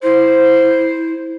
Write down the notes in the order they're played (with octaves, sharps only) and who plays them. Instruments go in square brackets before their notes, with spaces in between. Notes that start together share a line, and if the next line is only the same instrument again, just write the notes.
[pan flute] E4 [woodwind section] C5